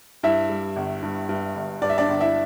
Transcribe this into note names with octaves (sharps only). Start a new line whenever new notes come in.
G2 E4 E5
G3
G1
G2
G2
G1
G2 D5
E5
D4 D5
G1
E4 E5